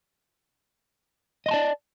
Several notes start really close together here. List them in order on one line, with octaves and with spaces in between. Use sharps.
D#5 C6 A5 D5